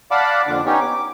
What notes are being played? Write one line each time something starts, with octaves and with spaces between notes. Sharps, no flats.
D5 F5 F#5 A5 B5 D6
F2 A#2 D3 D4 D6
B3 C#4 D#4 G4 C#5
D6